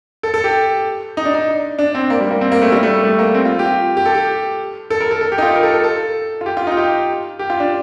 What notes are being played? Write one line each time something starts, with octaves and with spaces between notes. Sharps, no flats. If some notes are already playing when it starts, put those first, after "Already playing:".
A4
A4
G4
D#4
D4
D#4
D4
C4
A#3
G3
A#3
C4
A#3
A3
G3
A3
G3
A3
A#3
C4
F4
G4
F4
G4
A4
G4
A4
A#4
A4
A4
G4
D#4
F4
A#4
A4
A4
A4
F4
G4
F4
D#4
F4
G4
G4
F4
D4